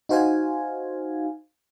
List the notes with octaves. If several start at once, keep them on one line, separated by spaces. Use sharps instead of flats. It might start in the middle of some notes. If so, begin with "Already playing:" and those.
D#4 F#4 C5 F5 G#5